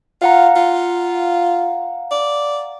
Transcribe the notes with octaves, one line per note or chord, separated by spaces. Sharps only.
F4 F5 F#5 A#5
F4
D5